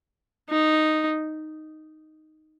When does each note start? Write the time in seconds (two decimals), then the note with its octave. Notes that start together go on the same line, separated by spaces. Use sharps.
0.50 D#4